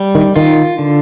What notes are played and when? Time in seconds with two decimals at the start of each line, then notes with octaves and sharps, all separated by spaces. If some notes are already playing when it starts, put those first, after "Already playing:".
Already playing: G3
0.15 D#3
0.36 D#3 F4
0.78 D3